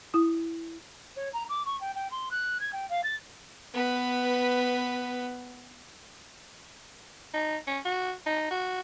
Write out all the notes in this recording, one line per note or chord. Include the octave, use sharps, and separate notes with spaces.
E4 D#6
C#5
A#5
D6
C#6
G5
G5
C6
F#6
G#6
G5
F5
A6
B3 B4
D#4
C#4
F#4
D#4
F#4